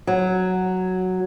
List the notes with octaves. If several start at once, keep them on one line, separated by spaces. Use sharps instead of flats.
F#3